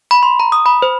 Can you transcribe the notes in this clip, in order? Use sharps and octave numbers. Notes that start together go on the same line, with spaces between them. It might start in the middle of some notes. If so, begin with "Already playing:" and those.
B5
C6
A#5
D#6
B5
C5